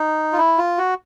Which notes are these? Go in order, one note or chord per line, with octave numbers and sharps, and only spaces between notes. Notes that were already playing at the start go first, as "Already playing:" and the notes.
Already playing: D#4
F4
E4
F4
F#4